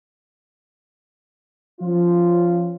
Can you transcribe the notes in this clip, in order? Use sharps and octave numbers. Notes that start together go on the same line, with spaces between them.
F3 C#4 F4